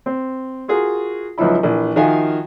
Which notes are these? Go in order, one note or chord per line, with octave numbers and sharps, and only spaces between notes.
C4
F4 F#4 G#4 A#4
C#2 F3 F#3 D#4 E4 B5
A#1 E3
D#3 F3 F#4 E5 F5 G#5